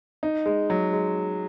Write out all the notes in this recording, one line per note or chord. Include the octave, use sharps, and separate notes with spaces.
D#4
G#3
F#3
G#3